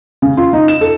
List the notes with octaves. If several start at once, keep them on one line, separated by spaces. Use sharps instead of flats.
C#3
F4
D#4
E7
A4